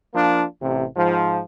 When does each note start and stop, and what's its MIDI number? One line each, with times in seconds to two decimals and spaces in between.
0.14 0.45 53
0.14 0.45 58
0.14 0.45 62
0.61 0.86 33
0.61 0.86 48
0.97 1.41 44
0.97 1.41 53